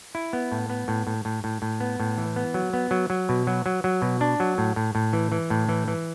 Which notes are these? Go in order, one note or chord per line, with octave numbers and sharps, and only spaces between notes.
E4
B3
A2
B3
A2
A2
A2
A2
A2
B3
A2
E3
B3
F#3
B3
F#3
F#3
B2
F#3
F#3
F#3
B2
D4
F#3
A2
A2
A2
E3
E3
A2
E3
E3